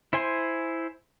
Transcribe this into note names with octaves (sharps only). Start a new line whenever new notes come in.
E4 C5 G#5 C6